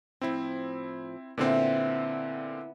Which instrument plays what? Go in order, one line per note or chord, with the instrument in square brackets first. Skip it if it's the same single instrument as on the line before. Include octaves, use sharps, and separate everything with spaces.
[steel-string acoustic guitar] A2 F3 [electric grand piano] C4 E4
[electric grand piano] A#2 D3 C4 [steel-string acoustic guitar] B3 E4